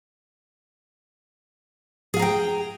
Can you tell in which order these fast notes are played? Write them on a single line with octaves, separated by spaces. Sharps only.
G#4 F5 A#5 G5